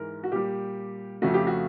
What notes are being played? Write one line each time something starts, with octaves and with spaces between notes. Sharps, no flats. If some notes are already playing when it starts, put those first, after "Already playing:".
Already playing: G#2 E3 G#3 A#4
F#4
A#2 G3 G4
F2 C#3 F3 A3 F#4
G4
F#4